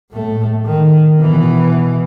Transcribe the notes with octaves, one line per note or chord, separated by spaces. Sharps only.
A2 A3
D#3
B2 E3